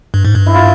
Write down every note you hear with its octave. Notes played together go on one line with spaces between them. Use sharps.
G2
G#2
G2
E4
F4